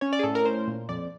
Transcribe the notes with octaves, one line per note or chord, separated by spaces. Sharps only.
C#4 C#5
D5
G#4
A2 A4
A#4
C#4 C5
A#2
F2 D5